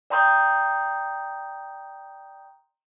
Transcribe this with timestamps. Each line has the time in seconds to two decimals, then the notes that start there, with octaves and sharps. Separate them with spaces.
0.10 D5 G5 A#5 C6 D#6 G6